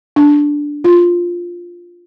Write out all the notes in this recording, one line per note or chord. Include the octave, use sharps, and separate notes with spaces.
D4
F4